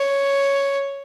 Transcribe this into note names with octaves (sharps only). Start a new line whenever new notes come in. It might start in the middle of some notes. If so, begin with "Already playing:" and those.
Already playing: C#5